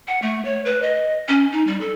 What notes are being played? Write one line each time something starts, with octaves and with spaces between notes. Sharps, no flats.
F#5
A3
C#5
B4
D#5
C#4
D#4
G3
A4